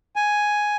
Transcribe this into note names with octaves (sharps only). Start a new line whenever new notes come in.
G#5